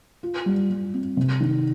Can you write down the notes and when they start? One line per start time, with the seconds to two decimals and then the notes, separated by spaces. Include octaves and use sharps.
0.23 F4
0.46 G3
0.70 G3
0.94 C4
1.17 C3
1.40 D#3